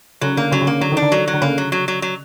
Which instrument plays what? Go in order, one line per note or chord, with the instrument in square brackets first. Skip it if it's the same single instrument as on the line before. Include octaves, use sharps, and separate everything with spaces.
[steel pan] C#3 [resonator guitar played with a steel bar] F#3
[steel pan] D3 [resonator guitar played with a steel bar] A#3
[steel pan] C#3 [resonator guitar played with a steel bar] F#3
[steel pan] C#3
[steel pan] D3 [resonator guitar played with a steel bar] A#3
[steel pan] D3 [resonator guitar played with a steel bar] F#3
[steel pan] D#3 [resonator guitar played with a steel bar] D4
[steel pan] D3
[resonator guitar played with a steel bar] F#3
F#3
[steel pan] D3
[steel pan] C#3 [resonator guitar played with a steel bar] A#3
[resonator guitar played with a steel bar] F#3
F#3
F#3
F#3